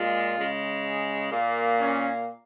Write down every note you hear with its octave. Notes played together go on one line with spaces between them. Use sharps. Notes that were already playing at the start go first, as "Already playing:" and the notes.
Already playing: A#2 G#3 F4
C#3 G#3
A#2 A#3
C#4